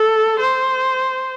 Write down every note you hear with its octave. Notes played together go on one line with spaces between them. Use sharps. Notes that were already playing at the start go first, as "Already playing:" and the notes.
Already playing: A4
C5